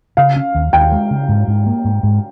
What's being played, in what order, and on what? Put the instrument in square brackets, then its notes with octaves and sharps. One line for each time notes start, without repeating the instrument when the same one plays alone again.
[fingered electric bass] C#3 [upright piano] F5
[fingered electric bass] C#4
D#2
[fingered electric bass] D#2 [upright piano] G5
[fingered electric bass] G#3
C#3
G#2
G#2
A#3
G#2
G#2